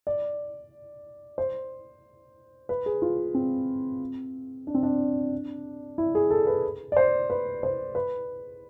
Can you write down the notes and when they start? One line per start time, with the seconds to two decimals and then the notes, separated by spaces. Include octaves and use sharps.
0.07 D5
1.38 C5
2.69 B4
2.86 G#4
3.02 F4
3.35 C4
4.67 D4
4.74 C4
4.83 D4
5.98 E4
6.15 G#4
6.31 A4
6.47 B4
6.92 D5
6.97 C5
7.30 B4
7.63 C5
7.95 B4